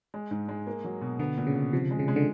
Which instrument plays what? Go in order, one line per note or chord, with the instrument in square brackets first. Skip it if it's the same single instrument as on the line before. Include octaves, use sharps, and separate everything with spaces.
[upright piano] G#3
G#2
G#3
A#3
F#3
B2
[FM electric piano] D3 [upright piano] B3
[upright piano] A#2
[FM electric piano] C#3
[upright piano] B3
[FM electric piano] C3 [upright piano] F3
[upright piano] G#3
[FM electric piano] C#3
[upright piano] G#3
[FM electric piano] D3